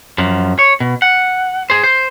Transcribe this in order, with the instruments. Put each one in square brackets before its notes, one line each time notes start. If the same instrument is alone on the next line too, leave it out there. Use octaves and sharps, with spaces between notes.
[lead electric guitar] F#2 F3
C#5
B2
F#5
G#4 C5
C5